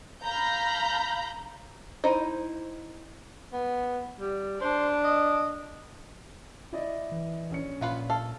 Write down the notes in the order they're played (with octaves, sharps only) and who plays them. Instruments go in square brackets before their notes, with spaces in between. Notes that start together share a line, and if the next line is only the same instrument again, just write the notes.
[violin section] F5 A#5 B5 G6
[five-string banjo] D#4 E4 C5 D#5
[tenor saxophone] B3
G3
[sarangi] D4 [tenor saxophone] C5
[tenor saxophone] D#5
[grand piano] E4 D5 D#5
[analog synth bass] E3
[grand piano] A#1 C#4 C#7
[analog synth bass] A#2 [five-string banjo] B3 F4 B4
[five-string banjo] A4 F5